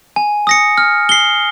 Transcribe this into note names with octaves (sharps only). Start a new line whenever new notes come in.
G#5
D#6 A#6 C#7
F6
C7 G7